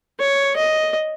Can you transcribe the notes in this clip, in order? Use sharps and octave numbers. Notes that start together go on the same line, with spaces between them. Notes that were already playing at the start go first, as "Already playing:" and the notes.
C#5
D#5